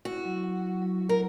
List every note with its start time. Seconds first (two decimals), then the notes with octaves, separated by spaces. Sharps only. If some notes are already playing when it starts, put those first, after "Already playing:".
0.05 E4 F#4
0.25 F#3
0.44 F#3
0.62 F#3
0.82 F#3
1.01 F#3
1.09 A#4